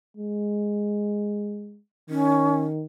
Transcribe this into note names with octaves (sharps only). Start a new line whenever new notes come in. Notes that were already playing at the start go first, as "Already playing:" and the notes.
G#3
D#3 C#4